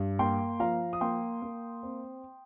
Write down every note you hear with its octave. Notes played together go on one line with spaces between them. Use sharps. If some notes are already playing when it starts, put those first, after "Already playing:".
Already playing: G2
A#3 G5 C6
F3 F5 A#5
D#6
A#3 G5 C6
A#3
C4